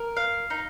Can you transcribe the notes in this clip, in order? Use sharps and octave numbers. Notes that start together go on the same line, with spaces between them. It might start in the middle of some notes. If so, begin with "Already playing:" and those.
Already playing: A#4
F5
D#4